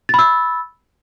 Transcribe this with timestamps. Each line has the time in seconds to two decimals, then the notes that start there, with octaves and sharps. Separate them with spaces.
0.09 A6
0.14 B5
0.19 E6